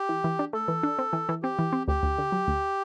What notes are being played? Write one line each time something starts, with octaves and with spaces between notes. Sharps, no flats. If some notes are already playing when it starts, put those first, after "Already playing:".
Already playing: G4
E3
E3
D4
A3 A4
E3
D4
C4
E3
E3
C4 G4
E3
C4
D2 G4
D2
D3
F#3
D2